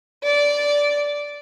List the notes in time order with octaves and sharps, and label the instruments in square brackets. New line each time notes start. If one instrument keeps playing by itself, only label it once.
[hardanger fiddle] D5